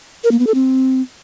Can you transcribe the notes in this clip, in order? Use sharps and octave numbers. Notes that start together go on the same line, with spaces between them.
A#4
A#3
B3
A4
C4